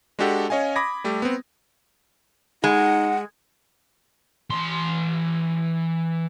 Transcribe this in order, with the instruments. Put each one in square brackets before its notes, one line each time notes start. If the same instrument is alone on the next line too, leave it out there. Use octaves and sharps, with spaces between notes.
[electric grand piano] G#3 D4 F#4 G4 A4 F#5
C#4 C#5 D#5 F5 G#5
B5 D6 D#6 G#6 A#6
G3 A3 G4
B3 C4
[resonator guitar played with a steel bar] G#3 [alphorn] D#4 [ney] F#5
[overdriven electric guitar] E3 C6